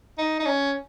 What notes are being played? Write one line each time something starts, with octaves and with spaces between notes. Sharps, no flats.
D#4
D#4
C#4